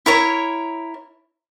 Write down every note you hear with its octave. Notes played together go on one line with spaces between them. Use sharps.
E4 A#4 C#5